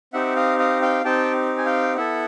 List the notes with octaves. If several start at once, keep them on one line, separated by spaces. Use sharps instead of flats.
C4 D#4 G4 E5 F#5
D#5 F5
D#5 F5
F5 G5
C4 D#4 G4 G5 A5
G#5
F5 G5
B3 E4 A4 E5 F#5